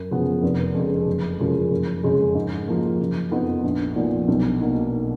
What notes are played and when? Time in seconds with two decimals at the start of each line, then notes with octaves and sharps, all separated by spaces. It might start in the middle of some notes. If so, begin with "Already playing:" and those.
Already playing: F#2
0.11 C#3 F3 B3
0.43 F1
0.75 F2 C#3 G#3
1.06 F#1
1.39 F#2 C#3 F3 G#3
1.71 F#1
2.04 F2 C#3 G#3
2.35 G#2
2.68 F3 A#3
3.00 F#1
3.31 F2 F3 B3 D#4
3.63 A#1
3.96 A#2 F3 B3 D#4
4.28 B1
4.59 B2 A#3 D#4